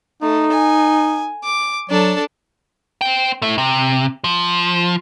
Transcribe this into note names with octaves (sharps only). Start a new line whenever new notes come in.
A3 D#4
G#5
D6
F#3 D4 A4
C5 G5
A3 E4
C3
F3